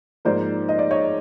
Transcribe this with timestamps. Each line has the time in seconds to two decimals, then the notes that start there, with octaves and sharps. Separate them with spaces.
0.25 G#2 F3 A#3 C5 D5
0.69 D#5
0.79 D5
0.91 C#5 D#5